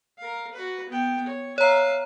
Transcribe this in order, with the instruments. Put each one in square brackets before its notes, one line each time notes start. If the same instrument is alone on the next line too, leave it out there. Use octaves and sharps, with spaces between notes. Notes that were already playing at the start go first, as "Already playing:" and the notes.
[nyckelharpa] A#4 F5
F#4 B4
B3 G5
C#5
[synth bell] C#5 A#5 [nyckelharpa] E5 F5